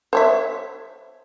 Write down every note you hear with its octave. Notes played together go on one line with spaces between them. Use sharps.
C5 C#5 E5